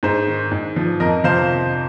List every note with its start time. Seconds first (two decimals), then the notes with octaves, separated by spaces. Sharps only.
0.03 G#2 G#4 C5
0.27 D#3
0.51 G#2
0.76 F3
1.00 F2 A#4 D#5
1.24 C3 F3 C5 F5